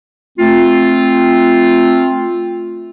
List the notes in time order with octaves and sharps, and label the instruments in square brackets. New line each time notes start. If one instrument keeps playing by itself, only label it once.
[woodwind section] A3 C4 F4